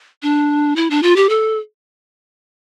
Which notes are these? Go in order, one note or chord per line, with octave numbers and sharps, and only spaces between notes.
D4
E4
D4
F4
G4
A4